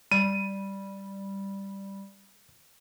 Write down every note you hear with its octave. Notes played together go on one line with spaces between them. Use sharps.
G3 D#7